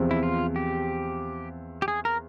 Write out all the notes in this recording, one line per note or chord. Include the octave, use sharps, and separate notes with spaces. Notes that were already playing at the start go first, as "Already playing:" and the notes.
Already playing: E2 C3 F3 C4
E4
F4
G4
G4
G#4
A#4